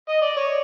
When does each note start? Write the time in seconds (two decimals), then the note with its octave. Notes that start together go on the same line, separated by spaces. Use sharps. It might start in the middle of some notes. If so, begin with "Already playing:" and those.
0.09 D#5
0.22 D5
0.37 C#5